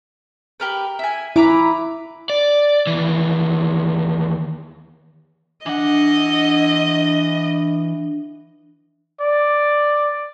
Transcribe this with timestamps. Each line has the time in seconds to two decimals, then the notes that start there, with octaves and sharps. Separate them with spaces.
0.60 G4 A#4 B4
0.99 E4 G#5
1.36 E4 B4 A#5 D6
2.30 D5
2.87 D#2 E3
5.66 E3 D4 D#5 F#5
9.21 D5